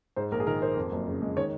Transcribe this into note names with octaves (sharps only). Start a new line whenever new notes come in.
G#2 C5
A#1 A#4
G#4
D#3 A#4
A#3 C5
F2
F#1
C#3
G#3
D#3 C#5